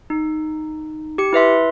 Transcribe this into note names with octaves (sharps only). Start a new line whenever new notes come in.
D#4
G4 C#7
E4 B4 E5 C6